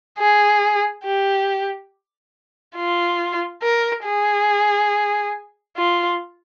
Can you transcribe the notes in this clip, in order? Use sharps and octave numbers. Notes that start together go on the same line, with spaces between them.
G#4
G4
F4
A#4
G#4
F4